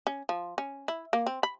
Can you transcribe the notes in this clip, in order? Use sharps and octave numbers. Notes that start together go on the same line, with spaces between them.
C#4
F3
C#4
E4
A#3
C4
B5